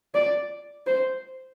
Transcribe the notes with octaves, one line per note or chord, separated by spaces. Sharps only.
D5
C5